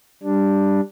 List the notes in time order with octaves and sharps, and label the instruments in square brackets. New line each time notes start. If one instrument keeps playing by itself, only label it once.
[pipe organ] G3 D4